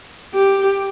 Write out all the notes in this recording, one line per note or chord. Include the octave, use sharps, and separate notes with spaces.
G4